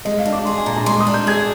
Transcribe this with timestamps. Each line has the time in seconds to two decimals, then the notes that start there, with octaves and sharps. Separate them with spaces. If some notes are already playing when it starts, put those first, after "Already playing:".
0.05 G#3 D#5
0.19 F5
0.25 D4
0.33 D6
0.46 G#4 C6
0.58 G#5
0.66 A#2 A#5
0.76 A#5
0.86 G#3 C6
0.96 D6
1.00 D#6
1.07 D4
1.14 G6
1.27 G#4 G#6